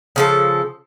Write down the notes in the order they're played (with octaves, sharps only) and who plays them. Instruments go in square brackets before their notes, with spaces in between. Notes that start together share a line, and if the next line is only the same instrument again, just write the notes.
[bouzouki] C#3 F3 A4